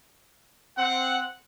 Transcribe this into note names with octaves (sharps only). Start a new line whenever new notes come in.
C4 F#5